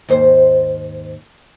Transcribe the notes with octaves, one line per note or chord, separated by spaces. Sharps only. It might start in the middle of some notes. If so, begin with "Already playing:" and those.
D#2 G#2 C5